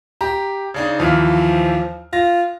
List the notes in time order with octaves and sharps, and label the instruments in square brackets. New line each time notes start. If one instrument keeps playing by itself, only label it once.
[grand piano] G4 A#5
C#3 D4 D#4
[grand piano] D#2 E3 F6 [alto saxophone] F3
[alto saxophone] F4 [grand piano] A#6